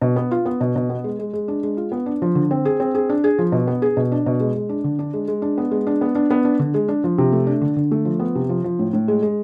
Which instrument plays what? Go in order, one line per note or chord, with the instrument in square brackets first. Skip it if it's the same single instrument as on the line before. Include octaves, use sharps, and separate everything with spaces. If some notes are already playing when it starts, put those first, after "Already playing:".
[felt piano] B2
B3
F4
B3
B2
B2
B3
G#3
G#3
G#3
D4
G#3
F4
B3
D4
F3
D3
C4
G#4
C4
G#4
D4
G#4
F3
B2
B3
G#4
B2
D4
B2
G#3
G#3
D4
D3
D4
G#3
G#3
D4
B3
G#3
D4
B3
D4
B3
D4
D3
G#3
D4
F3
C3
A3
D4
D3
D3
A3
F3
B3
C3
F3
F3
A2
A2
G#3
G#3